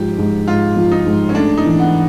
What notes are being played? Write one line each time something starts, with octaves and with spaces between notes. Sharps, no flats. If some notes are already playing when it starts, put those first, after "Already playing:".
Already playing: G#2 F3 G4
G#2
G#2 F4
F3
D#4
G#2
C#4
A3 D4
D#4
E3
B3